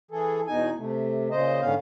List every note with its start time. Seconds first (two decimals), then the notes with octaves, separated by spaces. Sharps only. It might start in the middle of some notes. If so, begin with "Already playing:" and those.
0.11 E3 G#4 A4
0.47 E2 B2 D#4 G#5
0.77 C3 A3
1.31 A#2 C#3 C5 D#5
1.61 G#2 D3 B3 C#4 F5